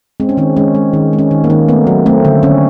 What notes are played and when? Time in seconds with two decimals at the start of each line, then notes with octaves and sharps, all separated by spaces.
0.20 G#3 C4
0.29 C#4
0.37 D#3 C4
0.57 G#3 C#4
0.75 G#3
0.94 D#3
1.13 G#3
1.19 C#4
1.31 D#3
1.44 A#3
1.50 D#3
1.69 A3 B3
1.87 F#3
2.06 A3 C4
2.25 D3
2.43 D3 C#4